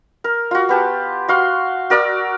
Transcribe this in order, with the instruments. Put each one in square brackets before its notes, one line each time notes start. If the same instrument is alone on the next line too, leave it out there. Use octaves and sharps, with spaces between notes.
[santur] A#4
F4 F#4
B3 G4 A5
F#4 F5 C6
F#4 A#4 D5 E6